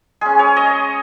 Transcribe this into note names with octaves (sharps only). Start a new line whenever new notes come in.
G#3 C#4 G#4
C#5
D#5